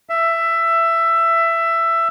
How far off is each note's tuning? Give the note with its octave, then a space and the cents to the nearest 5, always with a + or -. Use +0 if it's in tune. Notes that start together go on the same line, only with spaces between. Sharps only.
E5 +15